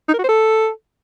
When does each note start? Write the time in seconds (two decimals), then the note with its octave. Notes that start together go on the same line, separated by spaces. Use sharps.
0.09 D#4
0.14 A#4
0.19 F#4
0.24 C5
0.29 A4